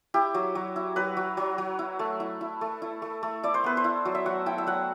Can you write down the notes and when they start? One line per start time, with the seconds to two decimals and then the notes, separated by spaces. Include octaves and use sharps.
0.14 E4 G4
0.34 F#3
0.55 F#3
0.76 E4
0.96 F#3 B4
1.17 F#3
1.37 F#3
1.58 F#3
1.79 E4
1.99 A3
2.20 E4
2.41 E4
2.61 A3
2.82 E4
3.02 A3
3.23 A3
3.43 E4 D5
3.54 C5
3.64 B3 B4
3.77 C5
3.84 E4
4.05 F#3
4.15 E5
4.26 F#3 F#5
4.46 E4 G5
4.58 E5
4.67 F#3 F#5